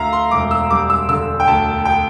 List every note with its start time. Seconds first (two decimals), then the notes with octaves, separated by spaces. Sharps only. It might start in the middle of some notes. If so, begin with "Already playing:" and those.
Already playing: D2 D3 E5 F5 A#5
0.13 C6
0.31 E1 D6
0.51 E6
0.70 G3 D6
0.90 E6
1.09 D3 E6
1.40 G5
1.48 D2 A5
1.85 G5